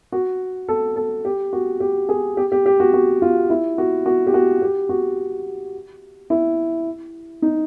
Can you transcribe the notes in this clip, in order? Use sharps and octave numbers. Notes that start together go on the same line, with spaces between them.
F#4
A4
A4
G4
F#4
G4
G#4
G4
G4
G4
F#4
F#4
F4
E4
F#4
F#4
G4
F#4
G4
F#4
E4
D#4